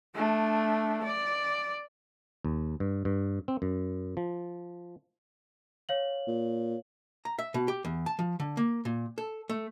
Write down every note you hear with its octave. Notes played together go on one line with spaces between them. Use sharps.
A3 D4
D5
D#2
G2
G2
C4
F#2
F3
C#5 F5 F#7
A#2
A#5
E5
B2
G4
E2
A5
F3
D3
A#3
A#2
A4
A3